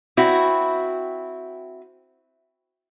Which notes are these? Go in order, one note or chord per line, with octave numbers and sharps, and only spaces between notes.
C4 E4 F#4